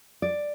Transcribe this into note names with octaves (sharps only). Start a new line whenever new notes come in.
D5